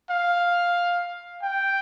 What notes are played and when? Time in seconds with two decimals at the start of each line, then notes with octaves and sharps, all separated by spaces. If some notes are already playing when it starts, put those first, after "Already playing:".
0.10 F5
1.42 G5